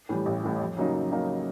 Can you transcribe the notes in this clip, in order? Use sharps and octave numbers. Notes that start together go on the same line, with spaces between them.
A2 E3 G3
A1
A2 E3 G3
F2
C#3 F#3 A#3 D#4
F2
C#3 F#3 A#3 D#4